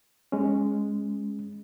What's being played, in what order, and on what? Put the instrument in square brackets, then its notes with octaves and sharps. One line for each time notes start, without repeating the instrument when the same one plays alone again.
[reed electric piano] G#3 C#4